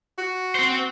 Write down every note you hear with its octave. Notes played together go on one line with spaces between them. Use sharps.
F#4
C4 C5